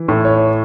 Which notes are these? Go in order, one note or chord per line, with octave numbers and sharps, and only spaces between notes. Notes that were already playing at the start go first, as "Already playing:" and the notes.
Already playing: E3
A2
C#5